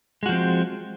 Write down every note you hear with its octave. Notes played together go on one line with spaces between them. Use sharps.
F3 G#3 C4 F#4